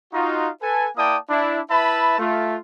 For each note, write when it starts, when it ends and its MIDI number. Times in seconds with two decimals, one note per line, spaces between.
0.13 0.49 63
0.13 0.49 65
0.13 0.49 66
0.62 0.87 69
0.62 0.87 71
0.62 0.87 80
0.96 1.16 58
0.96 1.16 64
0.96 1.16 74
0.96 1.16 79
0.96 1.16 81
0.96 1.16 87
1.29 1.60 62
1.29 1.60 64
1.70 2.16 64
1.70 2.16 71
1.70 2.16 76
1.70 2.16 81
1.70 2.16 83
2.19 2.56 57
2.19 2.56 65